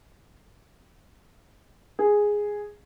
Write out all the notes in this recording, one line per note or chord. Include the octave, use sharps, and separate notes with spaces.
G#4